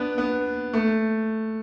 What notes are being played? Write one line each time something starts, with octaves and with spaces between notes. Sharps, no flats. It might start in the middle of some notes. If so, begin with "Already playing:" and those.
Already playing: B3 D4
B3
A3